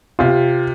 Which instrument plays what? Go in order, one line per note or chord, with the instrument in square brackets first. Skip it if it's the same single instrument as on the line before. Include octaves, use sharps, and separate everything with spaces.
[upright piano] C3 [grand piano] F4